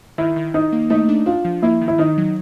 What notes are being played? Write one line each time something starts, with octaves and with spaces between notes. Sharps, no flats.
D#3 E4
D#3
D#3 D#4
A#3
A3 D#4
D4
D4 F4
F3
A#3 E4
D#3
E4
D#3 D#4
F#3